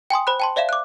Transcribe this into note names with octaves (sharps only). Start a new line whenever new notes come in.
G5 G#5 C6 D#6
C5 B5 F#6
G5 A5 C6
C5 D5 E5 F5 E7
D6 F#6